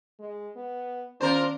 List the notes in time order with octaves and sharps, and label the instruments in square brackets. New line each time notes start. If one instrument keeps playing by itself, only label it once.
[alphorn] G#3
B3
[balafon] D#3 B3 C#4 [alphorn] D4 [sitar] F4 A#4 C5